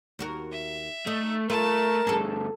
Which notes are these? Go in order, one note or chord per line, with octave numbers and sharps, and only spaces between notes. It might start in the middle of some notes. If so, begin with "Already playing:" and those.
D#2 F#4 A#4
E5
A3 D#4
A3 F4 A#4 A5
D2 G2 G#4 A4